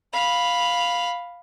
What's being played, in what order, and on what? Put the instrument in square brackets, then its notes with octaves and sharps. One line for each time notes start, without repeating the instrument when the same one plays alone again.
[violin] F5 B5